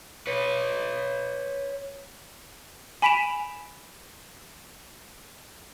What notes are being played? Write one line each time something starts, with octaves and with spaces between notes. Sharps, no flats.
B4 C#5
G#5 B5 B6 D7 E7 F7